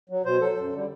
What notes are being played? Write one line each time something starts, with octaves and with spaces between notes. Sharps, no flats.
F#3
B2 C5
F#3 A4
F#2
D3 G3